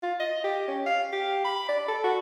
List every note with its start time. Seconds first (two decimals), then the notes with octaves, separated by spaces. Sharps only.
0.03 F4
0.20 D#5
0.44 G4
0.68 C#4
0.86 F5
1.13 G4
1.45 B5
1.69 D5
1.88 A4
2.04 F#4